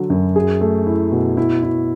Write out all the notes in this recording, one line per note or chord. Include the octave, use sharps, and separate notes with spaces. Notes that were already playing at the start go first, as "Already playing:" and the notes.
Already playing: D3 F#3
F#2
G#4
A3
E4
B2
E4
E4